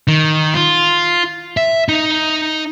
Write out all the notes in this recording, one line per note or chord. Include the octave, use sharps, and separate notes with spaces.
D#3
F4
E5
D#4